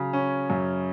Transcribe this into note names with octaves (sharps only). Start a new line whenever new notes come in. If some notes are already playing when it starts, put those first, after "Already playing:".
Already playing: C#3 F#3
C#4
F#2